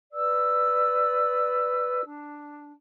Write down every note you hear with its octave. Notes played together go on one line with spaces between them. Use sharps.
B4 D5 E6
D4